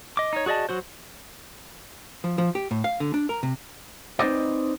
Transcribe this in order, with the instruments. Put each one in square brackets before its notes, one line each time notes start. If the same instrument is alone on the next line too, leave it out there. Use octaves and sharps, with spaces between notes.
[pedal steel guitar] D#5 D6
D#4 C#5
F#4 G#4 D5 D#5 A5
F#3 F#4 C5
[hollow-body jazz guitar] F3
F3
G4
A2
F5
D3
D4
A#4
C3
[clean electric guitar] C4 D#4 B4 C5 D5 D#5